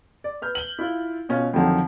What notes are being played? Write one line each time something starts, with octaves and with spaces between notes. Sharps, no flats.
D5
B4 F6 G6
F#7 G7
E4 F4
B2 C#4 F4
F2 D3 D#3 F3 F#3